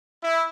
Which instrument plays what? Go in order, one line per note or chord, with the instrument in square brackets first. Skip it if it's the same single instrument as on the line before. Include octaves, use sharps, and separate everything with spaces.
[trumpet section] E4